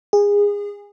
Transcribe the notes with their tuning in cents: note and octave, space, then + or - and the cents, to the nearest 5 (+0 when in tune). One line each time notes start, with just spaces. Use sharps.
G#4 -25